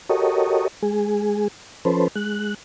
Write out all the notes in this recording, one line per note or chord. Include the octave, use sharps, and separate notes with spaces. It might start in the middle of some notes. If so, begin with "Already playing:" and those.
F#4 G4 A4 A#4 C#5 D#5
G#3 G#4
F3 C#4 A4 B4 C5
G#3 F#6